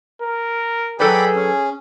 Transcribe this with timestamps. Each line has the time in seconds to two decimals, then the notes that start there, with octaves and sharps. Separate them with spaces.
0.22 A#4
1.00 F#3 G#4 A4 B4 D5 G5 B5
1.35 C#4